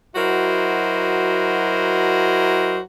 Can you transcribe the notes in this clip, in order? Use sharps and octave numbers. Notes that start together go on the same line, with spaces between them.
F#3 E4 F#4 A#4 C5 D#5